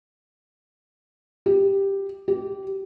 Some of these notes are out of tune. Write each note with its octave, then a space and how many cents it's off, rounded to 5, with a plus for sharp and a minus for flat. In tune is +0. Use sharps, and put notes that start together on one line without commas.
G4 +5
G4 -20